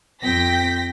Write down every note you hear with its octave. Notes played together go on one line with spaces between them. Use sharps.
F2 C4 G5 A#6 B6